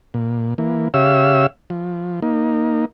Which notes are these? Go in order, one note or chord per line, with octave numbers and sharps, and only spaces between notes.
A#2
E3 A#3
C#3 G4 C#5 E5 F5 E6
F3
A#3 D#4